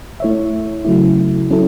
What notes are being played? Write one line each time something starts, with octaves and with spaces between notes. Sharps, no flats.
A3 E4 C#5 E5
C#3 F#3 A3 E4
F#3 C#4 E4 A4